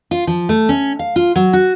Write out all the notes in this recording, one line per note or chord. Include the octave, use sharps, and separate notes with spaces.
F4
F3
A3
C#4
F5
F4
F#3
F#4